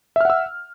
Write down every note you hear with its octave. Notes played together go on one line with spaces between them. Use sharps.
E5 F#5 E6 F6